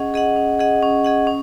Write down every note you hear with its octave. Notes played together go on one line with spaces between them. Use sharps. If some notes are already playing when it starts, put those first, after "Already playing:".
Already playing: C#4 G#4 D#5 F#5
G#4 D#5 F#5
C#4
G#4 D#5 F#5
C#4
G#4 D#5 F#5
C#4